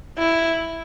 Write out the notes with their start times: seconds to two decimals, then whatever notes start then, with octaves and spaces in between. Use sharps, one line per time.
0.18 E4